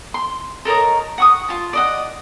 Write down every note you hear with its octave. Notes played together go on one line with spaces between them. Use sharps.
C6
A4 A#4 C#5 D#5
F#5 C#6 D#6
F4 A5
D5 D#5 F#5